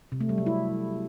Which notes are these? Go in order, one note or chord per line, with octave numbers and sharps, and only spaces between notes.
C3
A3
G3
F#3
E4